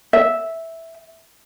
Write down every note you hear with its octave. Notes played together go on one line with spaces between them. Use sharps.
E5